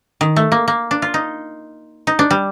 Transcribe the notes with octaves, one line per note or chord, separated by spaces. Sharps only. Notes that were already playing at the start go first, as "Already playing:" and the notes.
D#3
A3
A#3
A#3
D4
F4
D#4
D#4
D4
G3